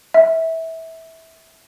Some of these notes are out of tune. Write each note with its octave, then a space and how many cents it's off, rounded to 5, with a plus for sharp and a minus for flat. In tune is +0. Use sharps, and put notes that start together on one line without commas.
E5 -20